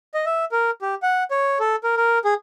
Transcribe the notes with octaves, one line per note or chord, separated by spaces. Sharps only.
D#5
E5
A#4
G4
F#5
C#5
A4
A#4
A#4
G#4